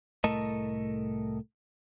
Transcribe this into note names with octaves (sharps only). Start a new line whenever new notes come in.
C2 A2 A3 A4 A#4 D#5